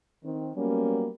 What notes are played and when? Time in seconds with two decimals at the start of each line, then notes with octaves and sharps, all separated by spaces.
0.24 D#3 C4
0.56 F#3 G3 A#3 B3 C#4